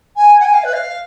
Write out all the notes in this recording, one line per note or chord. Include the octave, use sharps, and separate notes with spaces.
G#5
F#5
G#5
F5
B4
F5